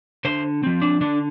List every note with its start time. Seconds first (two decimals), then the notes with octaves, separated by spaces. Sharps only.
0.25 D3 C5
0.63 F3 C4
0.82 D4
1.01 D3 D4